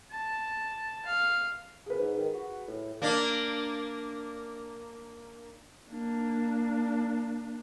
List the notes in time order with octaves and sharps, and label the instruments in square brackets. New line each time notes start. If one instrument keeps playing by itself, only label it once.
[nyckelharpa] A5
F5
[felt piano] G#4 B4
[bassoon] G#2
D#3
F#4
A2
[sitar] A#3 D4
[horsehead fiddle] A#3 D4